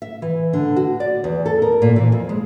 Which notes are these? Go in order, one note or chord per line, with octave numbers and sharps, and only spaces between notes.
E5
E3
D3
F#4
D5
E2
A4
A#4
A#2
E3
F2
G#3